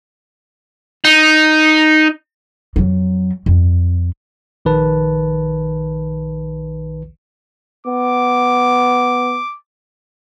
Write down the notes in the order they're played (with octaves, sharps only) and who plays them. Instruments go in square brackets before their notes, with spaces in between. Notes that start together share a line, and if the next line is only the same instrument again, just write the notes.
[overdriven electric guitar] D#4
[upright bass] F2 F#3
F2
[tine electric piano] A#1 D#3 B4 A5
[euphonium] B3 [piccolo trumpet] D6